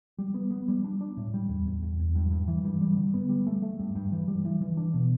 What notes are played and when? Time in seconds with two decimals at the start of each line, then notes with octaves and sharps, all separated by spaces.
0.18 G3
0.34 B3
0.51 B3
0.68 G3
0.84 D4
1.01 D4
1.17 A2
1.34 G3
1.49 E2
1.66 E2
1.82 E2
1.99 E2
2.15 G2
2.31 G2
2.48 E3
2.65 G2
2.81 G3
2.97 D3
3.14 B3
3.29 G3
3.47 A3
3.62 A3
3.80 G2
3.95 G2
4.12 E3
4.28 G3
4.45 E3
4.61 E3
4.77 D4
4.94 B2